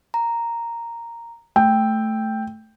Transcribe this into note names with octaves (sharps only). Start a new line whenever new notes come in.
A#5
A3 G5 E6